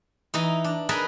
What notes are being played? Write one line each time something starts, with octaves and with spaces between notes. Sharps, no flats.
E3 D#4 D#5 A#5
D4
G#4 A#4 B4 D#5 A5 A#5